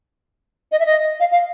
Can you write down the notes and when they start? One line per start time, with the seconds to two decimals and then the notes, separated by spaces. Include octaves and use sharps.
0.72 D#5
0.80 E5
0.86 D#5
1.20 F5
1.32 F5